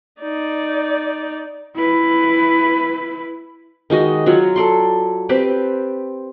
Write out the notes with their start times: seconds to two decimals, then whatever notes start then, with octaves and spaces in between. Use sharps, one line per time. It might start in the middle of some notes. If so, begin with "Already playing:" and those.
0.22 D#4 D5
1.76 E4 B4
3.90 D#3 G#3 F#4 D#5
4.26 F#3 F4 F#4
4.56 A4 D5 C6
5.29 C4 G4 B4 D5